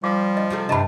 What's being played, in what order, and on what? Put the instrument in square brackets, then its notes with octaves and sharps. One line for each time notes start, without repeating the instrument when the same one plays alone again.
[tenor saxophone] F3 [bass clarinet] G3 [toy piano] F5 D6
[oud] D2 [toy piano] D#5
[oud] C3 G3 A3
[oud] G2 D4 [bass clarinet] C3 [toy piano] D#5 A5 B5